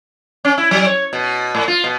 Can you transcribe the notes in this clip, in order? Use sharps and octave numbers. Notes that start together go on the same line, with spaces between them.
C#4
E4
F#3
C#5
B2
A2
F4
B2